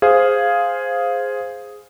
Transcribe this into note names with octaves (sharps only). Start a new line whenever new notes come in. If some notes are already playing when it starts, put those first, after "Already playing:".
G#4 C5 F5 D#6